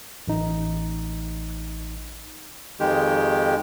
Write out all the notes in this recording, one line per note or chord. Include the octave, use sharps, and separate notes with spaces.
A1 D#4
F2 D#3 G#3 G4